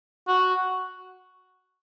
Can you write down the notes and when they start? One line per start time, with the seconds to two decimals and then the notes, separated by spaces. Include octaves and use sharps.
0.28 F#4